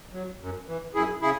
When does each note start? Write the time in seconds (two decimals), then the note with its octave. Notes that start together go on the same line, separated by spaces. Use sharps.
0.13 F#3
0.40 F#2
0.68 E3
0.94 F#2 E4 G#4
1.22 C#3 E4 G#4